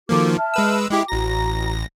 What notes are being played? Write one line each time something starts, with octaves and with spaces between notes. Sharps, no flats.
D#3 F3 A#3 F#4 A4 D6
E5 A5 F6
G#3 B4 E6
G#3 E4 G4 G5 D6
A1 F#4 A#5 A#6